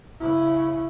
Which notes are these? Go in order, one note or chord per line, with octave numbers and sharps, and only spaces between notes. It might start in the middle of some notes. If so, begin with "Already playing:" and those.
C#3 E4